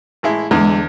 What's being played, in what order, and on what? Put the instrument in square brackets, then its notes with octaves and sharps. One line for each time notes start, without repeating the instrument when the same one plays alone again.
[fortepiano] A1 G#3 E4
[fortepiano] E2 D3 [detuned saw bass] G#3